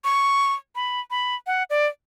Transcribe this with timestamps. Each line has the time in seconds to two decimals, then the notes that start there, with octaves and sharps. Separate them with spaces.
0.04 C#6
0.75 B5
1.11 B5
1.47 F#5
1.70 D5